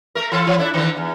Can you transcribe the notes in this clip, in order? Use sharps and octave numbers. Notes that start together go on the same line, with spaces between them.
A3 A#4
E3 F4 A4
E3
D4 E4 A4
D3 D#3
E2